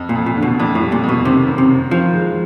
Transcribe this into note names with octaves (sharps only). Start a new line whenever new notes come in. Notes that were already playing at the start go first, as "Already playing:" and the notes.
Already playing: F2
A#2
F2
A#2
D3
B2
F2 A#2
A2
G3
A#2
F2
B2
C3 D#3
F#2
C3
F#2
D#3 F3
G#3